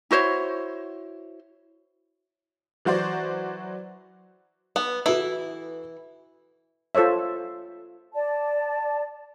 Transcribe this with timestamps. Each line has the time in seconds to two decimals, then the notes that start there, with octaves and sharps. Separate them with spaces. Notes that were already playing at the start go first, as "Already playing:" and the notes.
0.11 E4 F#4 C5 C#5
2.85 E3 F#3 F#4 C5 D5
4.76 B3
5.06 E3 E4 F#4 A4 B4
6.95 F4 A4 C5 C#5 E5
8.14 D5 A5